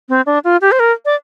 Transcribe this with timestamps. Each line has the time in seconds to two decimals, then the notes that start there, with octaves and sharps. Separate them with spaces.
0.09 C4
0.26 D4
0.44 F4
0.61 G4
0.72 C5
0.80 A#4
1.05 D5